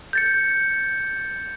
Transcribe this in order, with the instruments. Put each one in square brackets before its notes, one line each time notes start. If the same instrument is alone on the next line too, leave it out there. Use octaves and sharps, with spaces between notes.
[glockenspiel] G6 A6 C#7